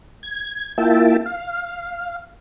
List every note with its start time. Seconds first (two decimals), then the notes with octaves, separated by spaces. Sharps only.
0.23 G#6
0.78 A#3 E4 F4 E5 G5 A5
1.26 F5